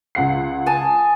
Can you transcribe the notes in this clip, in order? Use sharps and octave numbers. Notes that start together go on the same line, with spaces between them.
C#2 F#5 C7
G#5 A5 D#6